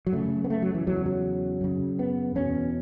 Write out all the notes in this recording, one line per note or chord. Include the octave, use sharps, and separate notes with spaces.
F#3
F#2 C#3 A3
B3
A3
F#3
E3
E2 C#3 F#3
F#3
F#2 C#3
B3
E2 B2 C#4